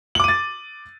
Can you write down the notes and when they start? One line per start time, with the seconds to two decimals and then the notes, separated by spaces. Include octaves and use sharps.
0.15 F#7
0.20 D6
0.24 D#7
0.28 A6